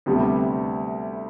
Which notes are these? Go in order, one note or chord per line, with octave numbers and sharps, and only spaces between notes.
D2 C3 G3 B3